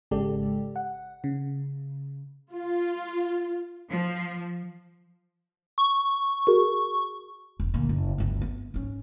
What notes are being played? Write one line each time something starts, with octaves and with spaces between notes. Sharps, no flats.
G#1 C#3 G#3 G4 A4 D5
F#5
C#3
F4
F3
C#6
F#4 G#4 A#4
E1
D2 A#2
F#1
G1 D2
B3
G#2 C#4